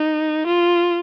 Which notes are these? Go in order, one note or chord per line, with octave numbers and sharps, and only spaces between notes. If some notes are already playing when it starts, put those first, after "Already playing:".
Already playing: D#4
F4